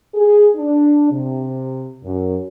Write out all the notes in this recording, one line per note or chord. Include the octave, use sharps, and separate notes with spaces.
G#4
D4
C3
F#2